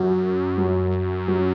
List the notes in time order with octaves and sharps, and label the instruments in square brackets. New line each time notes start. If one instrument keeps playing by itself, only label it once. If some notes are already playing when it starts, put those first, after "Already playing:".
Already playing: [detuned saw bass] F#2 [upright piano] F#3
[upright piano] F#3
F#3